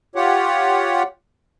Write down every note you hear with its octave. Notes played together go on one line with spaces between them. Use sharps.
F4 G4 C#5 F#5